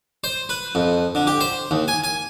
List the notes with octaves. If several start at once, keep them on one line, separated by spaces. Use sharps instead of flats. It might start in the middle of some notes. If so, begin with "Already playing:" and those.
C5
B4
F2
D3
G4
C5
D#2
G#5
G#5